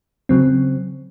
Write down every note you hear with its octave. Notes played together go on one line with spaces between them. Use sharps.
C#3 F#3 C4